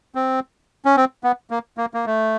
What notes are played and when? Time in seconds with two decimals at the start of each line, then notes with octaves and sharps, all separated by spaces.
0.15 C4
0.85 C#4
0.97 C4
1.24 B3
1.51 A#3
1.78 A#3
1.94 A#3
2.06 A3